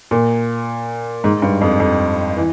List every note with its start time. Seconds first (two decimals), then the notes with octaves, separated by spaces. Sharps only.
0.11 A#2
1.24 G#2
1.42 G2
1.61 F2
1.80 F2
2.37 E3